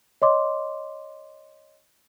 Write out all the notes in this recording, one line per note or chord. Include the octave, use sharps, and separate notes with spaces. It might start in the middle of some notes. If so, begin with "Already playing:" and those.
C#5 D#5 C6 D6